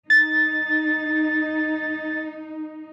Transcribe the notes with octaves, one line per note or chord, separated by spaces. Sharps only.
D#4 A6